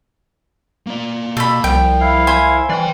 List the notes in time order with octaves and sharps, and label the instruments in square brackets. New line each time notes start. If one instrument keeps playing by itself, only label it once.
[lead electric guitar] A#3 D5
[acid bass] B2 [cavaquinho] A4 B5
[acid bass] C2 [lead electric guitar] F3 [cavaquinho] G5
[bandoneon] E4 F5
[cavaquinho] C5 G#5 B5
[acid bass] E3 [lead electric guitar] D5 G5